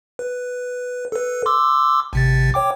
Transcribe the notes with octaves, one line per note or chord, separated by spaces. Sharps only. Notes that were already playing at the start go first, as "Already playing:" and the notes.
B4
A4 B4
C6 D6 E6
G#1 C3 A6
C#5 G5 D6